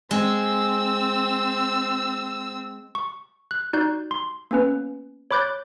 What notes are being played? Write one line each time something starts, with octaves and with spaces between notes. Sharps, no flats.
G#3 C4 E6
C#6
F#6
D#4 F#4 D5 F#6 G6
C6
A#3 B3 C#4 B4
C#5 B5 D6 F#6 G6 A6